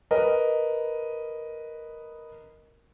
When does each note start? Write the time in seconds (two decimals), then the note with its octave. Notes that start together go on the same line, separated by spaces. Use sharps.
0.11 A#4 B4 D#5